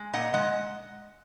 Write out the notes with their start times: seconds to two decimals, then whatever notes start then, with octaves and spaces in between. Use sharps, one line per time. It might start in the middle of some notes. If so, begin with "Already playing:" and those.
Already playing: G#3
0.13 A#2 D#5 F#5
0.34 G#3 D#5 F#5